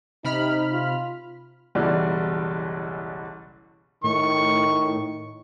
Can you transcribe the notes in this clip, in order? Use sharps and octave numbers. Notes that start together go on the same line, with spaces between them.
C3 D#4 B5 F6
F4
F#1 B1 E3 G3 F#4 D5
A2 D#3 C#6